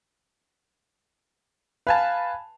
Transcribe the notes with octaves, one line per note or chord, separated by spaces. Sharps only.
B4 F5 G#5 A5